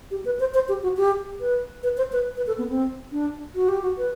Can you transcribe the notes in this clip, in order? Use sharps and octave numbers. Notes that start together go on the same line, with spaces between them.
G4
B4
C5
C5
G4
F#4
G4
B4
B4
C5
B4
B4
A4
B3
C4
D4
F#4
G4
F#4
B4